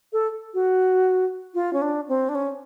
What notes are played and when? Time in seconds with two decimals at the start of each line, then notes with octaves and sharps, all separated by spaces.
0.13 A4
0.54 F#4
1.54 F4
1.73 C#4
1.82 D4
2.08 C4
2.29 D4
2.35 C#4